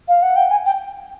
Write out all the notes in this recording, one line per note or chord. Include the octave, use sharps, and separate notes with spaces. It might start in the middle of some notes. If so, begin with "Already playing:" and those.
F5
F#5
G5
G#5
G5